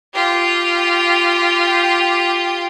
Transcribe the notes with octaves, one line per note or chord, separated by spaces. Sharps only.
F4 G4